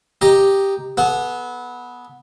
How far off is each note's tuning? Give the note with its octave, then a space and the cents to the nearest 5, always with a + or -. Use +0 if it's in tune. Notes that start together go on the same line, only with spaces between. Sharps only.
G4 +0 D#5 +0 A#5 +0
B3 -10 A4 -40